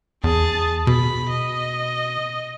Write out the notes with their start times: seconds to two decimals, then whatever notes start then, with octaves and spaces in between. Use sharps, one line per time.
0.24 E2 G#4 A5
0.87 B2 B5
1.30 D#5